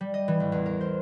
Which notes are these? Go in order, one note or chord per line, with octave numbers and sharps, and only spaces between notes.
G3
D#5
E3
A1
E2
A#4
C5